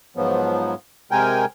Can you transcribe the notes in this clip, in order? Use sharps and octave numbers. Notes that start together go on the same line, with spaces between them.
G#2 F3 F#3 B3
C3 G#3 A#4 G5 G#5